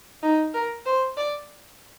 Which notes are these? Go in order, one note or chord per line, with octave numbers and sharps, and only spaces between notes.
D#4
A#4
C5
D5